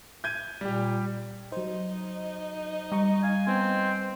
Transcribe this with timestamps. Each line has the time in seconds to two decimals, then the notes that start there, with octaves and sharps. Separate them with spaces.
0.24 G6 G#6 D#7
0.61 A#2 G3 G4
1.52 F#3 D#4 C5
2.92 G3 D#5 A#5 C#6
3.23 F5 G#5
3.47 B3 C4 D#4